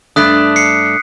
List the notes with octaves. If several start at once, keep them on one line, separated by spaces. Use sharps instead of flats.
G2 A3 D4 D#6 F#6 B6
C7 C#7